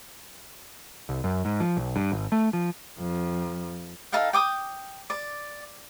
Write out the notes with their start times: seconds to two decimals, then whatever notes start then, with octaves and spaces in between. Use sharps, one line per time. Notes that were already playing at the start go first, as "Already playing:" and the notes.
1.09 C2
1.24 F#2
1.45 G#2
1.60 F3
1.77 B1
1.96 G2
2.12 G#1
2.32 A3
2.53 F3
3.00 F2
4.12 D#4 A4 F5 G5
4.33 G5 D6 D#6
5.10 D5